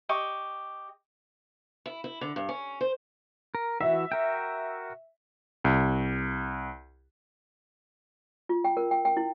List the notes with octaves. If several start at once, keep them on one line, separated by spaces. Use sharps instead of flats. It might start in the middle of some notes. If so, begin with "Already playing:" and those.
G4 D#5 C#6
E4
E4
D3
G2
C#4
C5
A#4
E3 F#4 E5
F#4 A#4 G5
C2
F4
G5
A#4
G5
G5
E4